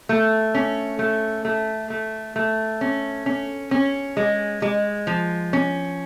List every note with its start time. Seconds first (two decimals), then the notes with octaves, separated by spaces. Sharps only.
0.09 A3
0.55 C#4
0.99 A3
1.45 A3
1.90 A3
2.36 A3
2.81 C#4
3.26 C#4
3.71 C#4
4.17 G#3
4.62 G#3
5.07 F3
5.53 C#4